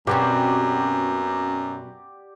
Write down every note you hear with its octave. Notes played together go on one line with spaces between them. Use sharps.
F#2 B2 C4 C#4 G4 D5 F#5